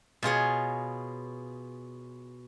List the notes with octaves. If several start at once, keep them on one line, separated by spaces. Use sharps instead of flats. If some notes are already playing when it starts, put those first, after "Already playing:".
B2 F4 G#4 C#5